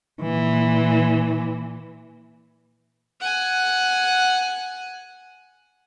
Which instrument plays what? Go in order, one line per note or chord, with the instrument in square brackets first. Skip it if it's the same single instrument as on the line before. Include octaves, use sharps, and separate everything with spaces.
[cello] A#2 E3
[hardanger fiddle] F#5 G#5